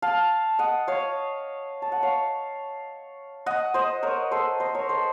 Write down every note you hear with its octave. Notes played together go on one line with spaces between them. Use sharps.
F5 A5
D#5 F#5
C#5 F5
A5
F#5
C#5 F5
D#5 F#5
C5 D#5
A#4 C#5
A4 C5
C5 D#5
A#4 C#5
A4 C5